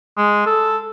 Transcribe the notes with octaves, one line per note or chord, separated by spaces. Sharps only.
G#3
A4